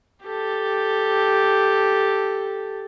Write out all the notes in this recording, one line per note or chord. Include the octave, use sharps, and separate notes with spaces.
G4 A4